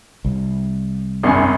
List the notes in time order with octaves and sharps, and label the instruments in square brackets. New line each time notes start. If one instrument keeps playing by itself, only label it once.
[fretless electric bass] C2
[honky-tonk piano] G#1 F#2 G#5